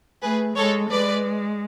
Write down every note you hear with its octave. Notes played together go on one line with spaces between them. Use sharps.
A3 G#4 B4
G#3 A4 C#5
G#3 B4 D5